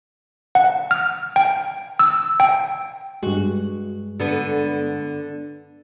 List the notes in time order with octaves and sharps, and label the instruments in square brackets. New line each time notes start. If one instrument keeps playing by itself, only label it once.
[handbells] F#5
F6
G5
E6
G5
[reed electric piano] G2 G#3 [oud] F#4
[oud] D3 B3